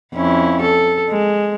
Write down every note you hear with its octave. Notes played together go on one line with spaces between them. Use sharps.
F2 C#4 E4
A4
G#3